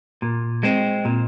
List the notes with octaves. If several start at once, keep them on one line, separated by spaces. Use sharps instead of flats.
A#2
G#3 C4
A#2